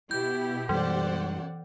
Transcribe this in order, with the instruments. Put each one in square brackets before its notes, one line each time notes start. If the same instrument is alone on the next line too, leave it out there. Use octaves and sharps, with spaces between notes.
[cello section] B2 G4 [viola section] E4 [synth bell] G6
[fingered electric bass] F#2 G3 G#3 [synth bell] E3 [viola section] C5 D5 F#5